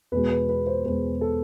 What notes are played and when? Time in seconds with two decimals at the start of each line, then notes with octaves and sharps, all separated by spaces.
0.12 E2 B2 G#3 B4
0.30 B4
0.49 B4
0.67 C5
0.85 E2 B2 G#3 B4
1.21 A4